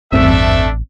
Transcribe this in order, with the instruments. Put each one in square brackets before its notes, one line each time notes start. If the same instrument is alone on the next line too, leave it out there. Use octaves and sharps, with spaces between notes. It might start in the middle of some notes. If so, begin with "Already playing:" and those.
[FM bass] A1 [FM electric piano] E2 G2 C4 [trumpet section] A3 D4 E5